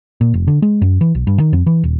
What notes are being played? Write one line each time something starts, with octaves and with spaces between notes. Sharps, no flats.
A#2
F1
D3
G#3
F#2
E3
B1
G2
D#3
F2
E3
D#1